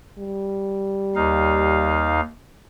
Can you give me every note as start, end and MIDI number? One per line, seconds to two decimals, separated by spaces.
0.18 2.24 55
1.15 2.20 39
1.15 2.20 63
1.15 2.20 77